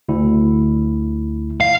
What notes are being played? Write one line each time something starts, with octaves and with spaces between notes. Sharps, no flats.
D2 E4
F5